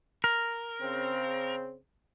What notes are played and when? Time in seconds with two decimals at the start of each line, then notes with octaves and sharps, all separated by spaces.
0.24 A#4
0.81 C#3 C4